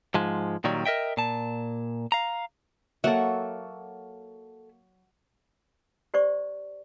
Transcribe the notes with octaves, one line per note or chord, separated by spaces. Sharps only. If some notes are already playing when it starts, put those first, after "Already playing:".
G#2 F3 G#3
A#2 D#3 F#3 G3
A#4 D#5 E5 G5
A#2 A5
F5 A#5
F#3 A#3 A4 E5 F#5
G4 C5 D5 C#6